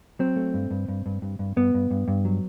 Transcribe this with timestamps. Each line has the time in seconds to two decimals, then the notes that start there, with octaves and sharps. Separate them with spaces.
0.19 F#3 C4
0.36 A3
0.54 G2
0.71 G2
0.88 G2
1.06 G2
1.22 G2
1.39 G2
1.57 G2 B3
1.74 G2
1.91 G2
2.08 G2
2.25 F#3